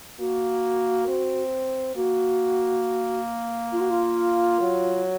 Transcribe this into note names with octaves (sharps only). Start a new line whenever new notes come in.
A#3 F#4
C4
A#3 F#4
F4
F#4
F4
F#3